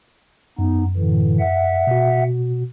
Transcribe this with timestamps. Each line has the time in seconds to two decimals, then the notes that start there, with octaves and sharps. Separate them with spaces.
0.59 F#2 B3 D#4
0.96 A2 D3 E3
1.39 E5 F#5
1.87 B2 F#4